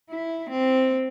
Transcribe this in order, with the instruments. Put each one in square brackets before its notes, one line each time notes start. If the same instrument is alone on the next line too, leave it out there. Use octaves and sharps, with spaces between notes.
[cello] E4
C4